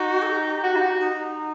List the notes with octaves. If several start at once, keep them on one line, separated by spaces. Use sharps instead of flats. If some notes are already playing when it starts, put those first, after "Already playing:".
Already playing: D#4 F#4
A4
G4
F#4
D#4
F#4
D#4